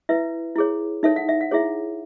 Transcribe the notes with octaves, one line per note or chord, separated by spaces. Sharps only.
E4 B4 E5
E4 G#4 C#5
D#4 A4 C#5 E5
F#5
E5
F#5
E4 G#4 C#5 E5